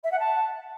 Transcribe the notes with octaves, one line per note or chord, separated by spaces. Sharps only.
E5
F#5
A5